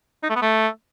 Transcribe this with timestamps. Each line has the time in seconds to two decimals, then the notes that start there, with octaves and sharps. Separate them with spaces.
0.23 D#4
0.29 A3
0.36 B3
0.42 A3